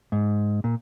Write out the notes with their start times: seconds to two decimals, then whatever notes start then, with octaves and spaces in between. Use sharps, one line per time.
0.12 G#2
0.64 A#2